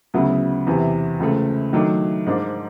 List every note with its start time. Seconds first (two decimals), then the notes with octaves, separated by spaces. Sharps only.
0.14 D2 C#3 F#3 B3 E4
0.67 E2 C3 E3
1.20 C#2 C#3 F3 A3
1.73 D#3 F#3 A3 D4
2.26 G#2 F3 A#3 D4